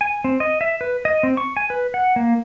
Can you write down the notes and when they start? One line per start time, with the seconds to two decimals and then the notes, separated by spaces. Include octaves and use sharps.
0.01 G#5
0.24 C4
0.40 D#5
0.61 E5
0.81 B4
1.05 D#5
1.23 C4
1.37 C#6
1.57 G#5
1.70 B4
1.94 F#5
2.16 A#3